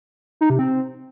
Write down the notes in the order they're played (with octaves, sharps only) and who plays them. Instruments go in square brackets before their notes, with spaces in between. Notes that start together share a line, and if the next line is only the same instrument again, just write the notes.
[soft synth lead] D#4
C3
C4